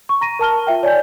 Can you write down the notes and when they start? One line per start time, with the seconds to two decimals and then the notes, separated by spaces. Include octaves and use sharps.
0.09 C#6
0.21 A#5 A#6 D#7
0.39 A#4 A5 F6 G7
0.67 F4 E5 G5
0.83 C#5 D5 G#5 G6